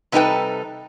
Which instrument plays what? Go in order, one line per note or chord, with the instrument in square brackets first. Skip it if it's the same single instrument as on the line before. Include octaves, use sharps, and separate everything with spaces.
[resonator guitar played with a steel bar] C3 G3 D#4 A4 B4 G5